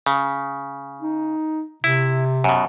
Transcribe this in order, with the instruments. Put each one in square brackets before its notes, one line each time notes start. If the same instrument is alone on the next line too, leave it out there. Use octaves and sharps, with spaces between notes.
[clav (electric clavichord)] C#3
[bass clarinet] D#4
[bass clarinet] C3 [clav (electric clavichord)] E4
[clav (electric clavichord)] F#2 B2